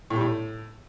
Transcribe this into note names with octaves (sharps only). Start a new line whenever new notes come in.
A2
G3
A2